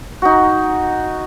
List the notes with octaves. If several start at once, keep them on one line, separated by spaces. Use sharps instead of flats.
D#4 F#4